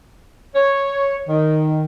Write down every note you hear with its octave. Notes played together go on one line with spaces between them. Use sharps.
C#5
D#3